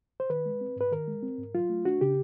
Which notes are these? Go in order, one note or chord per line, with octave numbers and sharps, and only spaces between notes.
C5
D#3 B4
G#3
C4
G#2 B4
D#3 A#4
G#3
C4
G#2
F#3 F4
A3
D4 F#4
C#3 G4